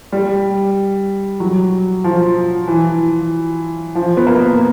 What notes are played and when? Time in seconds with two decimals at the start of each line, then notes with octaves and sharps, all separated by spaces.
0.13 G3
1.40 F#3
2.04 F3
2.68 E3
3.95 F3
4.17 B3
4.27 A#3